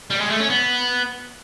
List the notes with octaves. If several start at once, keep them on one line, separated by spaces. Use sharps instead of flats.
G3
G#3
A3
C#4
B3